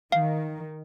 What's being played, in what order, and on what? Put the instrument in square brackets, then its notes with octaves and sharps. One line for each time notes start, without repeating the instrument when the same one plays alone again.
[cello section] D#3 [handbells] F5